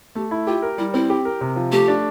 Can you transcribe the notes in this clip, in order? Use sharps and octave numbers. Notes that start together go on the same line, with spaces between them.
A3 G4
E4
F4 G4
A#4
G3 E4
C4 E4
G4
A#4
C3
F3
A3 G4
D4